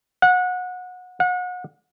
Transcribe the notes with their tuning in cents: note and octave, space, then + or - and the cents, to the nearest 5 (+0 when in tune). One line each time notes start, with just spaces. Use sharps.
F#5 -25
F#5 -35